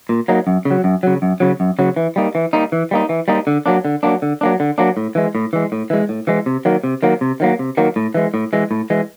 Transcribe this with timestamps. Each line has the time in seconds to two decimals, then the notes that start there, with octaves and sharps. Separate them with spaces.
0.09 A#2
0.28 F#3 A#3 D#4
0.47 F#2
0.65 C#3
0.71 F#3
0.84 F#2
1.03 C#3 F#3
1.22 F#2
1.40 C#3 F#3
1.60 F#2
1.79 C#3 F#3
1.96 E3
2.16 G3 A#3 D#4
2.35 E3
2.53 G3 A#3 D#4
2.72 E3
2.91 G3 A#3 D#4
3.09 E3
3.28 G3 A#3 D#4
3.47 D3
3.66 F#3 A#3 D4
3.85 D3
4.03 F#3 A#3 D4
4.22 D3
4.41 F#3 A#3 D4
4.60 D3
4.78 F#3 A#3 D4
4.97 A2
5.15 E3 G#3
5.35 A2
5.53 E3 G#3
5.72 A2
5.90 E3 G#3
6.09 A2
6.27 E3 G#3
6.46 C3
6.65 D#3 F#3 A#3
6.84 C3
7.03 D#3 F#3 A#3
7.21 C3
7.40 D#3 F#3 A#3
7.59 C3
7.77 D#3 F#3 A#3
7.96 A2
8.14 E3 G#3
8.34 A2
8.53 E3 G#3
8.71 A2
8.90 E3 G#3